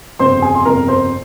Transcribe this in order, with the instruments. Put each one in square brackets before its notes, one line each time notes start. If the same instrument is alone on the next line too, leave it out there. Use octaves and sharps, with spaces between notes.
[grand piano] G1 F2 C#3 C5 C6
G#4 G#5
C6
G1 F2 C#3 A#4 A#5
C5 C6